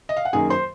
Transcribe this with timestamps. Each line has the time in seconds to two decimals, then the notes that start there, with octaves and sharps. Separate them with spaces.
0.09 D#5
0.17 F5
0.25 F#5
0.33 F#2 D#3 A#3 G#4 G#5
0.50 C5 C6